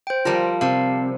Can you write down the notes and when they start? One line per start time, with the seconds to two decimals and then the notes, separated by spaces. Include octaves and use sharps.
0.07 C5 G5
0.25 F3 G3 F4 A#4 A5
0.61 C3 F5 A5